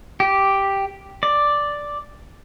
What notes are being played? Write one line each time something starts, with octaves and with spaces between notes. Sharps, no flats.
G4
D5